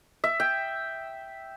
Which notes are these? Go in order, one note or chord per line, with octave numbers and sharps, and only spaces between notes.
E5
G5